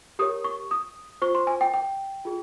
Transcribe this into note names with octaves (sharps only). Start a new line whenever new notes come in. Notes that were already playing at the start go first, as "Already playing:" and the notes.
G4 A#4 C#5 D#6
C#6
D#6
F4 C5 C#6
C6
G#5
G5
G5
F4 G#4